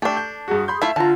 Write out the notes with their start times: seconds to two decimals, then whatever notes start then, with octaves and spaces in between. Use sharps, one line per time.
0.02 A3 D4 G4 A4
0.17 G6
0.48 G2 F#4 G#4
0.68 B5 C6 G6
0.82 A3 E4 F4 E5
0.96 D3 F4 A5 A#5